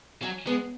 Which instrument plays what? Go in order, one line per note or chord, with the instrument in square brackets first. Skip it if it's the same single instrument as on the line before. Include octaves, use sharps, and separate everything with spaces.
[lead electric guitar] F#3 [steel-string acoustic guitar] C#4
[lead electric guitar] G#3 [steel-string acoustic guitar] B3